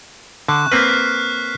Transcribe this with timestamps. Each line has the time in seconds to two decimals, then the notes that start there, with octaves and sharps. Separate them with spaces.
0.48 D3 C#6 F#6
0.72 A#3 C4 B4 F6 B6 C7